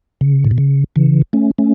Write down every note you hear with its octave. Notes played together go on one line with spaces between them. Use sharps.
C#3
A2
B2
C#3
C#3 E3
A3 C#4
A3 C#4